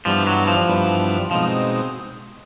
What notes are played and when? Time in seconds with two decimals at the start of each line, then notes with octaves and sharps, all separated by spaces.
0.05 G2 E3 F3 G3 B3 D4
0.27 F#3
0.47 F3
0.68 G2 E3 G3 B3 D4
1.31 B2 F3 G#3 C4 D#4